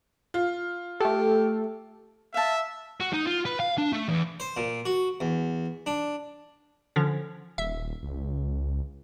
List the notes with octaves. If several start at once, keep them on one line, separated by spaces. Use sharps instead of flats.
F4
A3 G4 A4
E5 F5 A5
F#4
D#4
F4
B4
F5
D4
A3
E2
C5
A#2
F#4
E2
D4
D3 F3 C#4
D#1 E5
C#2